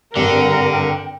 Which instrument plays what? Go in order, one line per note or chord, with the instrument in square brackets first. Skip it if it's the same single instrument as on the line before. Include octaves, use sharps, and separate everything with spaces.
[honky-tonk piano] G#1 G2 [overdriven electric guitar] D3 [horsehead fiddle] A#4 [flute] G5